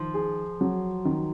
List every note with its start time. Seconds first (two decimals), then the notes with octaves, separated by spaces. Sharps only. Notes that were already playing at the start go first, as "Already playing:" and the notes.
Already playing: D#3 F3
0.14 G#4
0.61 F#3
1.05 D#3